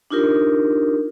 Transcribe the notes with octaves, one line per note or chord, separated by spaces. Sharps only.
D4 D#4 F4 G4 A#4